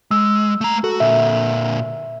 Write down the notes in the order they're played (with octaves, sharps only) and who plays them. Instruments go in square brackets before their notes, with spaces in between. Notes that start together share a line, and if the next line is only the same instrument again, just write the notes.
[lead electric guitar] G#3 [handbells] E6
[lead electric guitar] A3 A#5
[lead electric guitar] F#4 [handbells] A4
[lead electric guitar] A#2 D3 [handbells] E5